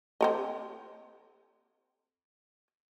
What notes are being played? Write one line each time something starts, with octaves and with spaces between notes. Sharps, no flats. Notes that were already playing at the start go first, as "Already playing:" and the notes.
C4 A4 D#5